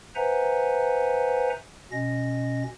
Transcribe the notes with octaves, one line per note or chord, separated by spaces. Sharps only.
B4 C5 E5 F#5 G#5 A#5
B2 C#4 D#5 A#6